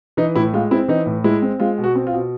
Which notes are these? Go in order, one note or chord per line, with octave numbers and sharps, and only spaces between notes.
E3 D#4
A2 E4
G#3 F4
C4 E4
E3 D#4
A2
G#3 E4
C4
G#3 F4
B2
F#4
C4
F4
B2